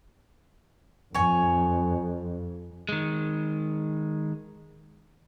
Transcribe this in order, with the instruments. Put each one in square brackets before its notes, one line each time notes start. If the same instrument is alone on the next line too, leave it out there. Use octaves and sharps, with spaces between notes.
[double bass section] F2 [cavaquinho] C#5 G#5
[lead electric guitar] D#3 G#3